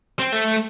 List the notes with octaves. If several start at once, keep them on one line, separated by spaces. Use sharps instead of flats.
C4
A3